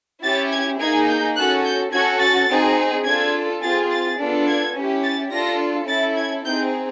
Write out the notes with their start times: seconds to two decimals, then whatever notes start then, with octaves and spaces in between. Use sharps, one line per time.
0.23 C#4 E4 G4 A6
0.52 G#6
0.80 A#3 D#4 G#4 G#6
1.08 G6
1.37 C#4 F#4 A4 F#6
1.65 G6
1.93 C#4 F#4 A4 G#6
2.21 A6
2.49 C4 D#4 G#4
3.05 D4 F4 A4 G#6
3.62 C4 F4 G#4 A6
3.91 A6
4.19 B3 D4 F4 A4
4.47 G#6
4.76 C#4 E4 G4
5.04 A6
5.31 D4 F4 A4 A#6
5.88 C#4 E4 A4 A6
6.17 G#6
6.45 C4 D#4 G#4 G6